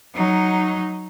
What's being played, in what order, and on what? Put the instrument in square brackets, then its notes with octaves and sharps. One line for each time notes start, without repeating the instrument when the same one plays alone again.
[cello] F#3 D#4